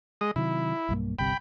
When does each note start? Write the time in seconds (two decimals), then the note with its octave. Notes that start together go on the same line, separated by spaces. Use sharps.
0.21 G#3 D#5
0.36 C3 D#3 F#3 E4
0.89 B1 G2 A#3
1.19 G1 C2 C3 G5 B5